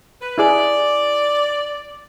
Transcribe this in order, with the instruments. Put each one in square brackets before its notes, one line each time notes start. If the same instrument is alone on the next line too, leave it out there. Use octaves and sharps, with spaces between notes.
[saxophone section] B4
[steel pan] E4 G#4 [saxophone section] D5